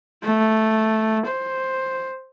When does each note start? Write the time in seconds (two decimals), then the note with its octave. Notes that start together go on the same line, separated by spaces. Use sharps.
0.23 A3
1.27 C5